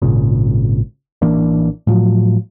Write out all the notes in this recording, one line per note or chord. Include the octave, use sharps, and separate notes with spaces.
G#1 A#2 C#3
A1 E3 A#3 D4
A2 F3 F#3